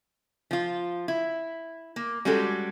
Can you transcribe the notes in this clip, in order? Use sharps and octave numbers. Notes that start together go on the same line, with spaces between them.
F3 F4
E4
A#3
G3 G#3 C#4 F#4 G4 A4